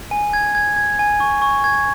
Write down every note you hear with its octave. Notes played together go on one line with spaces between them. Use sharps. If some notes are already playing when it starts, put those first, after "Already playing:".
G#5
G#6
G#6
G#6
G#5
C#6
C#6
G#6